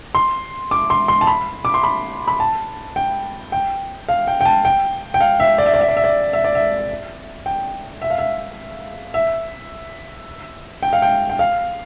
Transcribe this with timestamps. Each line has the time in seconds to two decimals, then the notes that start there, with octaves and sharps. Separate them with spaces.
0.15 C6
0.71 D6
0.90 C6
1.08 C6
1.21 A5
1.27 B5
1.65 D6
1.74 C6
1.84 B5
2.28 B5
2.40 A5
2.96 G5
3.52 G5
4.09 F5
4.28 G5
4.41 G5
4.45 A5
4.65 G5
5.14 G5
5.21 F5
5.40 E5
5.58 D5
5.66 E5
5.74 D5
5.81 E5
5.89 D5
5.97 E5
6.04 D5
6.33 E5
6.44 D5
6.55 E5
7.46 G5
8.02 E5
8.10 F5
8.18 E5
9.14 E5
10.83 G5
10.93 F5
11.02 G5
11.30 G5
11.39 F5